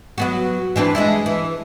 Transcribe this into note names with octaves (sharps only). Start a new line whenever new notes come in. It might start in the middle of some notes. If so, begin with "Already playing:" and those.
F#3 B3 F#4
E3 C4 D4
G#3 D4 E4
E3